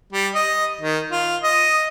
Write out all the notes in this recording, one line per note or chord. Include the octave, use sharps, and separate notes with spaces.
G3
D#5
D#3
F4
D#5